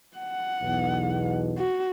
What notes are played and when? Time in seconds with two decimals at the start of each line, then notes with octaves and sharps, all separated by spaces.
0.17 F#5
0.62 B1 E2 B2
1.58 F#4